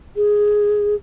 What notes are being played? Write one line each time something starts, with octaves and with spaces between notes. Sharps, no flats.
G#4